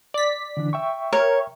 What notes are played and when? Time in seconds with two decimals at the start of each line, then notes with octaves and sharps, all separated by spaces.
0.14 D5 B6
0.57 D3 E3 D4
0.73 E5 G5 C#6
1.13 A#4 C#5